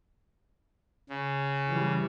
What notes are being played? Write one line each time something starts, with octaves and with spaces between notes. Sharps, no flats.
C#3
E3 G3